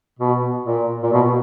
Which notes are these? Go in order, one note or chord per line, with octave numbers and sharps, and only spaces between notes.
B2
A#2
A#2
B2